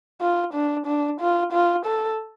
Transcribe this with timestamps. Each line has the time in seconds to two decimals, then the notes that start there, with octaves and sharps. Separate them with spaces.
0.21 F4
0.54 D4
0.86 D4
1.20 F4
1.53 F4
1.86 A4